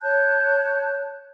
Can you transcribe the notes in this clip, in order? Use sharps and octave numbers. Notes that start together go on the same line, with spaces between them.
C#5 A5 F#6 G6